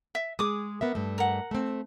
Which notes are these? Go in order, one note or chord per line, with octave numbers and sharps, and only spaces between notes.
E5
G#3 G#4 D6 D#6
B3 A#4 E5
G2 A3
A#4 F#5
A3 C4